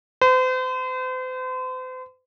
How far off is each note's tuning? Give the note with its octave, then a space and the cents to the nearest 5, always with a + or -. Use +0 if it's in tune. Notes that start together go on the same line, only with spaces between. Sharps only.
C5 -40